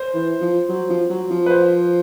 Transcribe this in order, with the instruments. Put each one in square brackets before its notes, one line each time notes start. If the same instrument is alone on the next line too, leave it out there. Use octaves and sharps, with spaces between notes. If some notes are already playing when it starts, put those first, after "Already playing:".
Already playing: [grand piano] C5
[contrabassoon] E3
F3
F#3
F3
F#3
F3
[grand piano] B4
C5